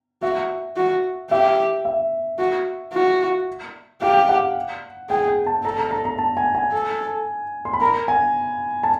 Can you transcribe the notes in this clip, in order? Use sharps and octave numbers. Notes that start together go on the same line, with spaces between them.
F#4 E5
F#4
G4 E5
E5
F#4
F#4
G4 F5
F#5
G#4 G5
G5
A5
A4 A#5
A#5
A#5
A#5
A5
G#5
G#5
A4
C6
B5
A#4 A#5
G#5
A5